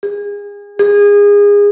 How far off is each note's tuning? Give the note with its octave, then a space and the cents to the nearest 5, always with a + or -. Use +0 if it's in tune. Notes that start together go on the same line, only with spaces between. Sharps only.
G#4 -30
G#4 -25